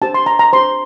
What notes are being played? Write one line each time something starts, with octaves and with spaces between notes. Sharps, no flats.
D4 G4 C5 A5
C6
A#5
A#5
D4 G4 C5 C6